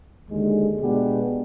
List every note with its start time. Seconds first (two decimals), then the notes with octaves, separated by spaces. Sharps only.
0.28 D#2 D3 G#3
0.80 B2 G#3 B3 D4 G4